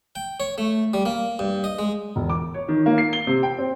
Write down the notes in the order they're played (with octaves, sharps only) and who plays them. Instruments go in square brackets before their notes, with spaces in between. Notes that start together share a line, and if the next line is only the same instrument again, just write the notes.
[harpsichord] G5
C#5
A3
G3
A#3
G2
D#5
G#3
[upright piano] E1
D6
C#5
D#3
A#3
C7
G7
C3
G5
C4